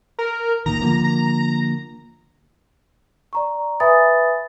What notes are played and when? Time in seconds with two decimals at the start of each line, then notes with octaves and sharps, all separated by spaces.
0.19 A#4
0.66 D1 A#2 D#3 A#5
0.82 D3 F3 A#3
1.04 A#5
3.33 D5 A#5 C#6
3.80 B4 E5 G#5 B5 D#6 A6